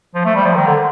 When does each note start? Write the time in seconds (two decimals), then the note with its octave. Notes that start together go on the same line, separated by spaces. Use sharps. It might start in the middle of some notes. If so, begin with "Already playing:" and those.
0.15 F3
0.25 A3
0.35 G3
0.45 F3
0.56 D#3
0.66 D3